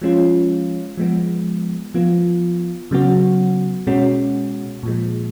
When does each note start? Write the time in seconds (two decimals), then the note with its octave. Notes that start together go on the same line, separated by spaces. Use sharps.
0.02 F3 G#3 C#4 F4
0.97 F3 G#3 B3
1.94 F3 B3 F4
2.91 C#3 F#3 B3 F#4
3.87 B2 G#3 C#4 F#4
4.83 A#2 F3 G#3